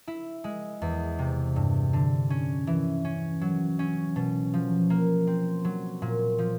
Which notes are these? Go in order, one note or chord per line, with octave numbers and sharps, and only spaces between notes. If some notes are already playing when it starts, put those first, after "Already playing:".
E4
G#3
E2
C3
G2
D3
C#4
E3
C#4
F#3
C#4
B2
F3
A#3
C4
F#3
A#2
F3